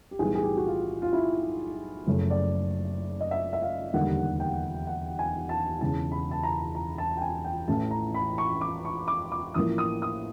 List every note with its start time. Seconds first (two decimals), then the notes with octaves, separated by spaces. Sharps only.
0.11 G4
0.19 B1 A2 E3 G3 G#4
0.35 G#4
0.43 G4
0.56 F#4
0.67 F4
1.02 F4
1.13 E4
2.06 F#1 F#2 C#3 F3 A3
2.30 D5
3.21 D#5
3.31 E5
3.53 E5
3.62 F5
3.93 E1 D#2 D3 G3 A#3 F#5
4.40 G5
4.87 F#5
5.19 G#5
5.49 A5
5.81 E1 E2 C#3 A5
6.11 B5
6.31 A5
6.43 A#5
6.75 A#5
6.98 A5
7.17 G5
7.22 G#5
7.44 G5
7.68 A1 A2 E3 A3 C#4 A5
7.91 A#5
8.14 B5
8.38 C#6
8.61 D6
8.85 C#6
9.08 D6
9.32 D6
9.54 A1 A2 F3 A#3 D#6
9.78 D#6
10.02 D#6